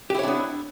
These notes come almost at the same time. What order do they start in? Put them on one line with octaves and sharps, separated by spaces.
G4 E4 C#5 D4 B3